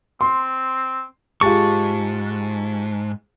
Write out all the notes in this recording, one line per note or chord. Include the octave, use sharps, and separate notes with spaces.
C4 C6
G#2 F4 G4 G#4 A5 C#6